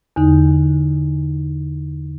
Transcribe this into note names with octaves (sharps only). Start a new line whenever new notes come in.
E2 D3 D#4